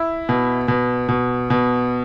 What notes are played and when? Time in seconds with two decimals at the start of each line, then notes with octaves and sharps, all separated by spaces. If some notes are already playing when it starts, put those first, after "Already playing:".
Already playing: E4
0.29 B2
0.68 B2
1.09 B2
1.50 B2